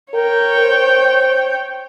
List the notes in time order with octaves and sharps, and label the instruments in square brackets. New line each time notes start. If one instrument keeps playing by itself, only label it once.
[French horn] A#4 [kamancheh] C#5 G5
[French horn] C5